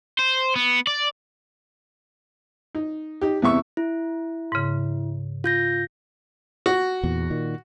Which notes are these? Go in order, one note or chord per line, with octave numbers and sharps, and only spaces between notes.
C5
B3
D5
D#4
D#4 G4
E2 C3 E5 C#6
E4
G#2 C#3
F4 G6 A#6
F#4
E2 A#2
A#2 D#3